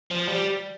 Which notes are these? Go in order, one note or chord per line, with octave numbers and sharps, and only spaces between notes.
F3
G3